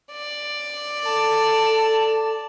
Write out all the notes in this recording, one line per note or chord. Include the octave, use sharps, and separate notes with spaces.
D5
A4 A5